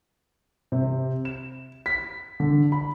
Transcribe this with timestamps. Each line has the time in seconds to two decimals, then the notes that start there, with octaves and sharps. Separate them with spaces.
0.72 C3
1.25 E7
1.86 B6
2.40 D3
2.72 B5